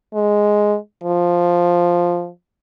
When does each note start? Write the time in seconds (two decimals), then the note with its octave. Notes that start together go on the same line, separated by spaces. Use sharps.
0.14 G#3
1.03 F3